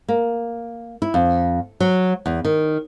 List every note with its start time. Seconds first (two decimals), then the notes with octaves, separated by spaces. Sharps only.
0.08 A#3
1.02 E4
1.14 F2
1.80 F#3
2.26 E2
2.45 D#3